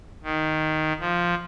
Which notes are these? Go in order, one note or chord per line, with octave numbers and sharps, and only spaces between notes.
D#3
F3